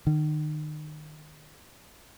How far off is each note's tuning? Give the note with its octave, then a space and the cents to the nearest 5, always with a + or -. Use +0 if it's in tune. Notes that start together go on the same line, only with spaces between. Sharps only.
D#3 -35